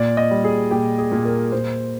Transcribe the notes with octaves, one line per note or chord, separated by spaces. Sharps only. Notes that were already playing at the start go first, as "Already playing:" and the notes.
Already playing: A#2 D5
D#5
G3
G#4
A#2 G4
G#4
A#2
A#4
A#2 C5